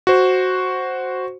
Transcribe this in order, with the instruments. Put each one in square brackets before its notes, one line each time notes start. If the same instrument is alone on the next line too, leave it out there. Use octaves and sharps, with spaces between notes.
[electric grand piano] F#4 C5